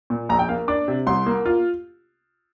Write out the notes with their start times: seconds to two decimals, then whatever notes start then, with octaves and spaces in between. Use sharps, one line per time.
0.10 A#2
0.29 A#1 A#5
0.39 G5
0.49 A#3 F5
0.68 D4 D6
0.88 C3
1.07 C2 C6
1.26 A#3
1.46 F4